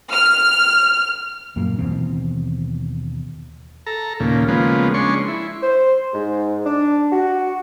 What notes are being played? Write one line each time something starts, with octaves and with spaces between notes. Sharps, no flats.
F6
F#2 A#2 F#3 A#3
D#2 B2 E3 C4
A4 A#5
D#2 A#2 C#3
C#3 F3 G#3 A#3 B3
G#3 C#4 D4 C6 C#6
E4
C5
G#2
D4
F#4